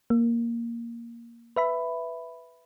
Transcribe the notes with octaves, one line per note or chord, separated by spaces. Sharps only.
A#3
B4 E5 B5